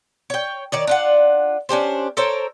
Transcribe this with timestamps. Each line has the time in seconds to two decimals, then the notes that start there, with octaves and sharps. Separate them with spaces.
0.30 C#5 G5
0.72 D#3 C#5 D5
0.87 D4 F4 F#5
1.69 C#4 D4 G4 C5
2.17 A4 A#4 C5 C#5